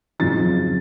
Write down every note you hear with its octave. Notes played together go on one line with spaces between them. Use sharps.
F2 C#3 F#3 A6